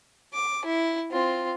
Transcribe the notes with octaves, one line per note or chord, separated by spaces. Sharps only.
D6
E4
C4 F4